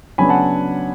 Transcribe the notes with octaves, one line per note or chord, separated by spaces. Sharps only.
C#3 F#3 B3 D4 G#5 B5
F#5 A5